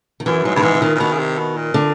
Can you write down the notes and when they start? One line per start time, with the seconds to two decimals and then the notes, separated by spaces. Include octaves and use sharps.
0.20 D#3
0.26 F#2 E3
0.45 G#2 F#3
0.55 G2 D#3
0.63 G#2 E3
0.75 E3
0.82 A#2 D#3
0.95 A#2
1.00 B2 D#3
1.13 C#3
1.18 C3
1.38 B2
1.56 A#2
1.74 D3